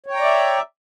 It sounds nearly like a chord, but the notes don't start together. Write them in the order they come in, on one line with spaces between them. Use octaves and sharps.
C#5 G5 A#5 D5 E5